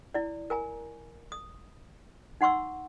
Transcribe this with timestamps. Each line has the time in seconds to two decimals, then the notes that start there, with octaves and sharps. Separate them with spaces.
0.14 E4 D5
0.50 A#4 G#5 A#5
1.32 D#6
2.41 D#4 F#5 C6 C#6 E6